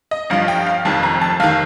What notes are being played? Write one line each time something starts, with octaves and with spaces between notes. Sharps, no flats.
D#5
G1 G2 F3 F5
G5
F5
F1 F2 D#3 A5
A#5
A5
F1 D#3 F5